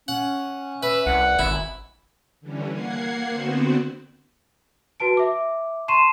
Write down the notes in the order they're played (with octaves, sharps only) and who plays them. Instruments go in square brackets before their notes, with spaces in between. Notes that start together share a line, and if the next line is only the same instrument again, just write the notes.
[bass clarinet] C#4 [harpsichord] F#5
[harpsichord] B4 [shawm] E5
[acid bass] C2 [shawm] F#5
[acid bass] G#1 [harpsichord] E4
[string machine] D3 E3 G3 C#4
A#3 F#5 G#6 C7
D3 B3 C4 F#4 C5
[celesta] F#4 B4 A5 D7
E5 D6
A5 C6 C#6 C7 D#7 E7